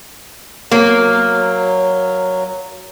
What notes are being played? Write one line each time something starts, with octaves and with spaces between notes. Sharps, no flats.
F#3 A#3